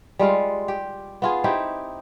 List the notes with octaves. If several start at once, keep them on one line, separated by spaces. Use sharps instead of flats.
G3 G#3 F4 F5
G4
B3 F4 G#4
C4 D#4 E4 G4